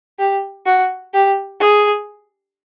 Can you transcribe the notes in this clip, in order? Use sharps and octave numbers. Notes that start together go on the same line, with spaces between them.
G4
F#4
G4
G#4